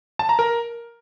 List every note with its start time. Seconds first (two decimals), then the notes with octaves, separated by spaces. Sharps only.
0.19 A5
0.29 A#5
0.39 A#4